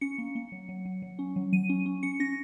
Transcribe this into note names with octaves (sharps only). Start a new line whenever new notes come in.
C#4 C#7
A#3
A#3
F#3
F#3
F#3
F#3
C#4
F#3
F#3 D#7
C#4
C#4
C#4 C#7
C#4 A#6